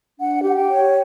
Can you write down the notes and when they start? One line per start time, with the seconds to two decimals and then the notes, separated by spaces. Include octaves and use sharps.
0.19 D4 F#5
0.43 G4
0.49 F#5
0.55 G5
0.68 C#5